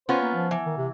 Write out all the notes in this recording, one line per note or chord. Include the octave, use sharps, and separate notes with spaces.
B3 C#4 F4 C5
A#3
F3
E3
D#3
C3